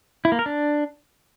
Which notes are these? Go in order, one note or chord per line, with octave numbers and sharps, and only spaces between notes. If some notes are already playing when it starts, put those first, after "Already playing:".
E4
A#3
A#4
D4